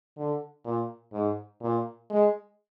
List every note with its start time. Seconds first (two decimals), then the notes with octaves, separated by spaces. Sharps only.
0.17 D3
0.65 A#2
1.13 G#2
1.61 A#2
2.10 G#3